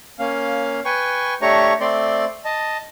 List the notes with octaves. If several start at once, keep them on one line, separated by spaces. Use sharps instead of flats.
A#3 C#4 F5
B4 G5 G#5 C#6
A3 D4 G4 C#5 A#5 C#6
A3 C4 D5 C6
D#5 A5